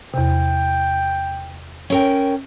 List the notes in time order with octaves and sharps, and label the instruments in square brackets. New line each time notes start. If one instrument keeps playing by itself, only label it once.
[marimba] E2 C3 [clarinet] G5
[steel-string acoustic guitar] C#4 A#4 G5